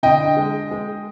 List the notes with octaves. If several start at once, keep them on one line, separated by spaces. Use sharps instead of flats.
D3 D#5 G5
G#3
G#3